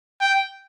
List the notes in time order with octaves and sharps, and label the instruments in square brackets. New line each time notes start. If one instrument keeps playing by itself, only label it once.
[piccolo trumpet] G5